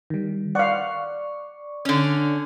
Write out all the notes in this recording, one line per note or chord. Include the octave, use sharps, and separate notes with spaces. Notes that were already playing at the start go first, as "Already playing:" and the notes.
D#3 G3
D5 F5 F#5 C#6
D3 C#4